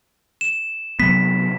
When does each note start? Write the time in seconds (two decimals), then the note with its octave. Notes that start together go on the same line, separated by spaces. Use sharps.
0.41 E7
1.00 C3 F#3 B3 B6